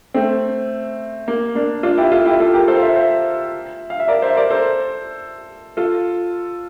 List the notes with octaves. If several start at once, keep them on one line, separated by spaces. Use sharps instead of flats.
A3 C4
A#3
A#3 D4
D4 F4
E4 G4
F4 A4
E4 G4
F4 A4
G4 A#4
A4 C5
F5
C5 E5
C5 E5
F5
E5
A#4 D5
C5 E5
A#4 D5
A4 C5
F4 A4